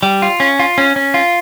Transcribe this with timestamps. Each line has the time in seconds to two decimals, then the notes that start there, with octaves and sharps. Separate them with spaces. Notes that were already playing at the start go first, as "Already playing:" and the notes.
0.03 G3
0.22 F4
0.40 C#4
0.59 F4
0.78 C#4
0.96 C#4
1.14 F4